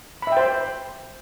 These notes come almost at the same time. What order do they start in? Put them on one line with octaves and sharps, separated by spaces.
B5 E5 G5 C5